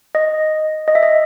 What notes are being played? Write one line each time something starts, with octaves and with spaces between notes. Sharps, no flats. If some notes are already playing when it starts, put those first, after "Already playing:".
D#5
D#5
E5
D#5